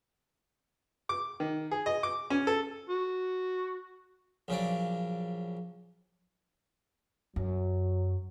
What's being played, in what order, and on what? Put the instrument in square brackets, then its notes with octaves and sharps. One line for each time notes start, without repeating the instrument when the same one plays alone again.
[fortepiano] D6
D#3
G#4
D#5
D6
C#4
A4
[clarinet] F#4
[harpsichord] A#1 C#3 F#3 D5
[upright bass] F#2 [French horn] F#3